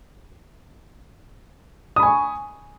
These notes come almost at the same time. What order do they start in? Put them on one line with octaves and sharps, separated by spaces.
D#6 B5 G#5 C#6